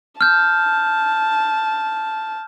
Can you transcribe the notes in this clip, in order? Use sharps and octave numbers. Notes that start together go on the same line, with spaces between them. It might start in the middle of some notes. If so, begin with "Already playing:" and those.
A5 F6 G6